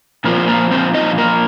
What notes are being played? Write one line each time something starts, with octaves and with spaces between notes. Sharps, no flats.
A#2 F3 A#3 C4 F4 A#4
A#3 A#4
C4 C5
D#4 D#5
A#3 A#4